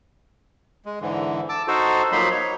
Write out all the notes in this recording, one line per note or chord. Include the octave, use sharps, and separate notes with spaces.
G#3
G#2 D3 E3
A5 D6 E6
D#4 F#4 A4 C5
F3 F#3 A#3 D#4 B5 C6
D#4 C#5